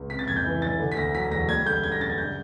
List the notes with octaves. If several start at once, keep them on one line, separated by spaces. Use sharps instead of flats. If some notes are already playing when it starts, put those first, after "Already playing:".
Already playing: C#2
C3 B6
A6
F2 G#6
G6
E3
F1 A6
D3
B6
D2 A#6
F#3 B6
E1 A#6
G3 G#6
D3 G6
F#2 G#6
A#6
F#2 A6
G#6
C#3 G6